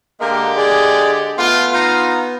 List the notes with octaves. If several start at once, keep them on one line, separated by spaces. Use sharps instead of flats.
D3 G#3 A#3 G4 A#4
G#4 D5
A3 B3 F4
D#4 F4 F5